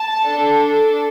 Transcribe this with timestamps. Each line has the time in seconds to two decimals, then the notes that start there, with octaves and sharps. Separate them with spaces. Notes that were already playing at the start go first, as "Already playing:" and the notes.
Already playing: A5
0.24 D4 A4